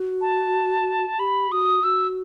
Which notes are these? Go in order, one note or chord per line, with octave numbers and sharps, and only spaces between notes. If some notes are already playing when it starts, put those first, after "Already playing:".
Already playing: F#4
A5
G4 B5
F#4 D#6
F#4 E6